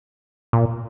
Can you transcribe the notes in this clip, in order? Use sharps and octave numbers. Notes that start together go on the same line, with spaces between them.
A#2